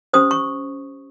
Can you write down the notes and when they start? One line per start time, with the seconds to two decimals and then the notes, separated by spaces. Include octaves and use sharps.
0.13 C#4 G4 C5 D#6
0.31 C#6